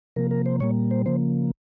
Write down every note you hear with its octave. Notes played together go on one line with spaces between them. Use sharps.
C3 F3 A#3 A#4
A#4
C5
A#2 G3 A#3 C#5
C5
C#3 F3 A#3 C5